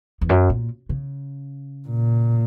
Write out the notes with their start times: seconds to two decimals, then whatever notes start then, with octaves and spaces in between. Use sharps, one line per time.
0.21 E2
0.29 F#2
0.50 A#2
0.89 C#3
1.88 A#2